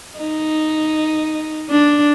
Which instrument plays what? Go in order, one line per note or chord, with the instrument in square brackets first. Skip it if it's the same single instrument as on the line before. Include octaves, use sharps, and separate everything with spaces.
[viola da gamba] D#4
D4